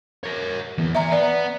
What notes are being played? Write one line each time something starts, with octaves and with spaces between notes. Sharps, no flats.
A#4 C#5
E3 B3
D5 E5 G#5 A#5
B3 D5